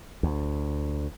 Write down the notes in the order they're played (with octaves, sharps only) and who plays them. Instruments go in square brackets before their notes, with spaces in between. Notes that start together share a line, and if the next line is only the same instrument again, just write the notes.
[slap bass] D2